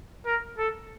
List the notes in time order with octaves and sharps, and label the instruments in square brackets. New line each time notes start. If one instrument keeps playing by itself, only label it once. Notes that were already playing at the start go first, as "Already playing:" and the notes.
[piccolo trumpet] A#4
A4